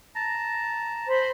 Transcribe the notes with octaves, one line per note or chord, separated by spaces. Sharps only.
A5 A#5
C5 B5